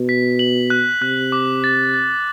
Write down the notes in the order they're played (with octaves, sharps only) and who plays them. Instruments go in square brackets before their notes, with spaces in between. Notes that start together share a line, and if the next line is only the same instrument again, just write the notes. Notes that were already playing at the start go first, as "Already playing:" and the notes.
Already playing: [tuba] B2
[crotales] B6
F#7
F#6
[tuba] C3 [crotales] F#6
[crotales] D6
A6
A6